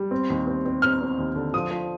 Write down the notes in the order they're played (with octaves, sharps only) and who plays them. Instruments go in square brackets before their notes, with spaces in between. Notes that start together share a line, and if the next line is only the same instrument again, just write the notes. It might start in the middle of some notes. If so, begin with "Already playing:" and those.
Already playing: [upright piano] G3
C4
D#2
C4
C4
C4 F6
C4
D#2
D3
F3 D#6
F3